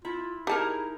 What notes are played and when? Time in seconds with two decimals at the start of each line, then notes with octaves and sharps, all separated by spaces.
0.05 E4 F4
0.47 D#4 E4 G4 G#4 A#4 A5